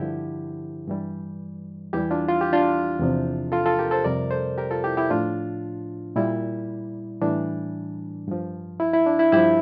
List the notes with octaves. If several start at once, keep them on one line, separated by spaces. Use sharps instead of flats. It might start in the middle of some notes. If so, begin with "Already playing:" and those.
Already playing: G2 D3 F3 E4 G4
G2 E3 G3
E2 E3 G3 E4 G4
D4 F4
F4
G4
D4 F4
E2 C3 F3
F4 A4
F4 A4
G4 A#4
A4 C5
F2 C3 G3 A#4 D5
A4 C5
G4 A#4
F4 A4
E4 G4
E4 G4
A2 F3 D4 F4
A#2 G3 E4
A2 E3 G3 D4
G2 F3
E4
E4
D4
E4
G2 F3 E4 G4